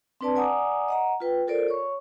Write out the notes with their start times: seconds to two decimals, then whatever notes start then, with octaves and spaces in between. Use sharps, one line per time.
0.21 C4 D4 B4 D5 A5
0.36 D5 F#5 G#5 A#5 D6 D#6
0.88 D#5 F#5 A#5
1.20 F4 B4 G5
1.47 F4 A4 A#4 C5 D5
1.68 C#5 C#6